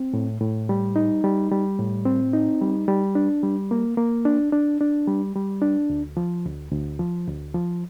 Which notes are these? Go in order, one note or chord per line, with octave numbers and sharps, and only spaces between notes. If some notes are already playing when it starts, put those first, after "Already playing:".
Already playing: C4
A2
A2
G3
D#4
G3
G3
A2
C4
D#4
G3
G3
D4
G3
A#3
A#3
D4
D4
D4
G3
G3
D4
D2
F3
D2
D2
F3
D2
F3